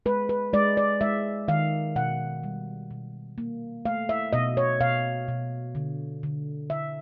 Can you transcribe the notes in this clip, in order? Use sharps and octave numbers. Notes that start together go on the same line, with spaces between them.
G#3 B4
B4
G#3 D5
D5
G#3 E5
D#3 F5
B2 F#5
G3
B2
A#3
A3 F5
E5
B2 D#5
C#5
B2 F5
B2
D3
D3
D3 E5